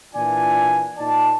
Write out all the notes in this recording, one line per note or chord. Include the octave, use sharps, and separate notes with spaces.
A#2 E3 D4 F4 D5 G#5
A#2 D#4 D5 A5